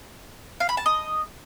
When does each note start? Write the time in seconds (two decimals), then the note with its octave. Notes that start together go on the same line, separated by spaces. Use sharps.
0.60 F5
0.69 B5
0.77 A5
0.86 D#5